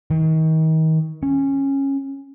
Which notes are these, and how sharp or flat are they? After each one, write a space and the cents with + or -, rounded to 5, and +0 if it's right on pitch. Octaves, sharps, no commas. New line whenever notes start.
D#3 +35
C#4 -15